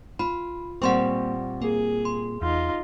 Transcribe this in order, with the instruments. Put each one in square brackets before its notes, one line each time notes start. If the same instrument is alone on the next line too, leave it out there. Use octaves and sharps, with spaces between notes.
[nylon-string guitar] F4 [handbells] B5
[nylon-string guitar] A#2 G3 C4 [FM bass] A#3 [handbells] F#5 C6 C#6
[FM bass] A#3 [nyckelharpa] G#4
[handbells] C6
[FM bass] E2 [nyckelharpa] D#4 F4